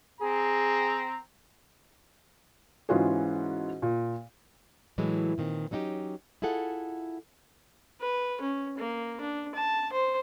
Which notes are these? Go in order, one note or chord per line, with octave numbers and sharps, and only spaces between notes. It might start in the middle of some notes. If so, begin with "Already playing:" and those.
C4 G#4 A#5
G#2 E3 C#4 F4 F#4 G#4
A#2
A2 E3 F#3 G#3
A#2 D#3 C4
F#3 C#4 D#4 F#4 G4
E4 F4 G#4 A4 F#5
B4
C#4
A#3
D4
A5
C5